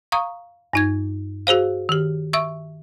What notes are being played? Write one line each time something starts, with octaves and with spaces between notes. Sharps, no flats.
F5 A#5 C#6 D#6
G2 D#4 G#6
F#4 G#4 C5 F5
D#3 G4
E5 C#6 E6